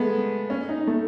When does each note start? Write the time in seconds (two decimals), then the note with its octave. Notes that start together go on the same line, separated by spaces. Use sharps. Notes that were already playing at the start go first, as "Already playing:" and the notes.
Already playing: G#3 A3 B3
0.50 C#4
0.69 D#4
0.87 A3